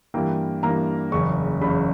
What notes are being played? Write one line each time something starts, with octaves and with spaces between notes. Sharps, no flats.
G2 E3 A#3 G5
G2 E3 A#3 A#5
F#1 E2 C#3 C#6
F#1 E2 C#3 B5